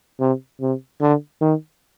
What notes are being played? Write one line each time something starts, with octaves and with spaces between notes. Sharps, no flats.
C3
C3
D3
D#3